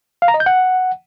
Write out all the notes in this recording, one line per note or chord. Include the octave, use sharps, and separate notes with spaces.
F5
A#5
D#5
G6
F#5